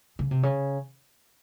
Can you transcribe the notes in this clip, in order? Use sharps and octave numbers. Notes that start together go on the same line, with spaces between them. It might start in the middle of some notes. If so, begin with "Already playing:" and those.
C#3
C3
C#3